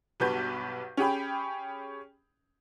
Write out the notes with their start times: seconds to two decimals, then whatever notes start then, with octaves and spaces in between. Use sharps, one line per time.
0.20 B1 G2 B2 B4 G6
0.97 C#4 G4 G#4 G5 B5